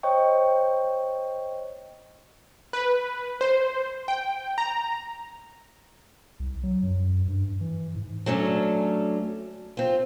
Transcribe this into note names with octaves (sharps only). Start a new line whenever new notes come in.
C5 C#5 D#5 G5 C#6
B4
C5
G5
A#5
C2
F#3
F#2
G2
E3
G#2
F#3 A3 C#4 D4
C4 F4